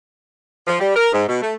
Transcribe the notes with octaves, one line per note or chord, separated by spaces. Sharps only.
F3
G3
A#4
G#2
B2
A3